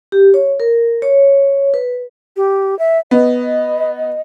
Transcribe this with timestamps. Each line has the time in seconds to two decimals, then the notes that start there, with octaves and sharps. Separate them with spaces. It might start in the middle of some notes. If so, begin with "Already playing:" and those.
0.12 G4
0.34 C#5
0.60 A#4
1.02 C#5
1.74 B4
2.37 G4
2.79 E5
3.11 B3 D#5